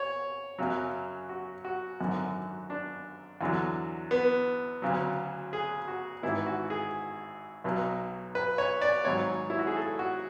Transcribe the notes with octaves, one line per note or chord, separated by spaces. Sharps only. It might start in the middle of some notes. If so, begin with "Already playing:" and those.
Already playing: C#5
F#2 C#3 F#3
F#4
F#4
G#1 F#2 D3 F#3
D4
E2 D3 F#3
B3
D2 C#3 F#3
G#4
F#4
G#1 G#2 E3 E4
F#4
G#4
B1 B2 F#3
B4
C#5
D5
G#1 G#2 F#3 C#5
E4
F#4
G#4
A4
F#4